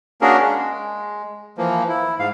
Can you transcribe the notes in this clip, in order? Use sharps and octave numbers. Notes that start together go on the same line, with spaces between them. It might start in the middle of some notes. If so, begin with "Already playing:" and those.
A#3 C#4 D4 F#4 G#4 A#4
G#3
E3 F3 A#3
E4
G#2 F5